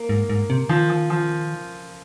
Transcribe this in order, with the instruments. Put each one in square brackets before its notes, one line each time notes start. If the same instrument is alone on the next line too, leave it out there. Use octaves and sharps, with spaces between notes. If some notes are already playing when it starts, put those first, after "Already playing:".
Already playing: [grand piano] A#3
[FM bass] G#2
G#2
C3
[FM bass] D#3 [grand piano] F3
[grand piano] F3
F3